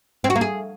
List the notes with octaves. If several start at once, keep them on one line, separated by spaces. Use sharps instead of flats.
C4
F#4
A#3
G#4